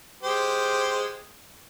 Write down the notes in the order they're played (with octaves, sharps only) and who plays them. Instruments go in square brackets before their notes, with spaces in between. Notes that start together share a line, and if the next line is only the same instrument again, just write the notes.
[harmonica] G#3 G4 C5